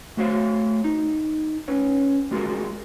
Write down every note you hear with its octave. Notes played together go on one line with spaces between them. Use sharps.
A3 F#4 C5 C#5 E5 F5
D#4
C#4 B4 C#5
G3 G#3 F4 F#4 G#4 A#4